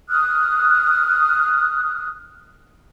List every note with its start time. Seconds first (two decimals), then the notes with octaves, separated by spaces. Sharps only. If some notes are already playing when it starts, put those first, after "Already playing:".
0.09 D#6 F6 F#6